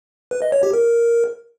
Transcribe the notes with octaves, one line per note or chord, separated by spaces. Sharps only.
B4
D#5
C#5
G4
A#4